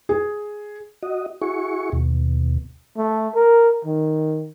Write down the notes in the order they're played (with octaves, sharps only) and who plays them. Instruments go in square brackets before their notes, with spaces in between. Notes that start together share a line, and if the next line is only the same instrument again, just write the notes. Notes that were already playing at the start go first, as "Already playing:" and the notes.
[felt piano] G#4
[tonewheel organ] F#4 D#5
E4 F#4 G#4 C#6
D#2 B2
[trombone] A3
A#4
D#3